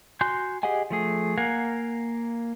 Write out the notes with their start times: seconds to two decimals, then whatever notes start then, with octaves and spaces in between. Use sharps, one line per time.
0.21 F#4 G#5 C6 F#6 G6
0.63 G4 G#4 D#5 F#5 G#5
0.90 F3 A3 G#4
1.38 A#3 A#4 F5 F#5 G#5